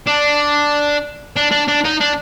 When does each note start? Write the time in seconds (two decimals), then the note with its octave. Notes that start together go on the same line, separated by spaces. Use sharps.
0.07 D4
1.36 D4
1.52 D4
1.68 D4
1.84 D#4
2.00 D4